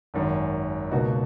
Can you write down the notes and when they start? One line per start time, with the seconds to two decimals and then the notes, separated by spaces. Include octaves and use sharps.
0.14 G#1 F#2 D#3
0.91 C#2 B2 A#3 D#4 F#4